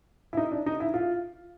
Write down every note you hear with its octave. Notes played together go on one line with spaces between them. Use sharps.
E4
D#4
D4
D#4
E4
F4